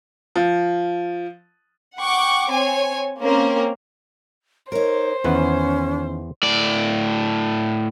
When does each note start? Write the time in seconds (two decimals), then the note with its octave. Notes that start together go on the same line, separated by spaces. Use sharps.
0.36 F3
1.99 F#5 G5 C#6 D6
2.51 C4 C#5 G#5
3.22 A#3 C4 C#4 A#4
4.72 D#4 A#4 C5 C#5
5.24 E2 D#3 C#4 B4 F#5
6.43 A2 D5